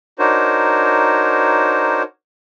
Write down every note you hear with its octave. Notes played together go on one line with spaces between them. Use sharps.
D4 D#4 F#4 A#4 C5 C#5